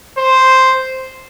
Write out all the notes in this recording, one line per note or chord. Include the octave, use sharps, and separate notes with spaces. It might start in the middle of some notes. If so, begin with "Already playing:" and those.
C5